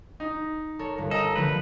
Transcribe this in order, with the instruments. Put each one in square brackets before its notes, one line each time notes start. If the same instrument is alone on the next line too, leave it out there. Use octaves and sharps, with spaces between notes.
[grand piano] D#4
[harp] A4 A#4 C#5
G1
[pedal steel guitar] A4 [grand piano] D#5 A#5
[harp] D3 F3 A3 [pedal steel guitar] B4